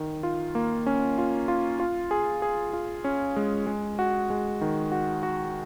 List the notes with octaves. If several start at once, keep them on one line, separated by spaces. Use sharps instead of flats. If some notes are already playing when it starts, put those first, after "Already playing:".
Already playing: D#3
F4
A#3
C#4
F4
F4
F4
G#4
G#4
F4
C#4
G#3
G#3
F#4
G#3
D#3
F#4
F#4